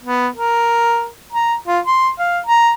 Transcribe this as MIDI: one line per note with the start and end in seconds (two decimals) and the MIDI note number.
0.03 0.28 59
0.35 1.07 70
1.33 1.54 82
1.68 1.80 65
1.87 2.10 84
2.19 2.39 77
2.47 2.72 82